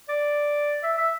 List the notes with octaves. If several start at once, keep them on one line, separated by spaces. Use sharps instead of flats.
D5
E5
E5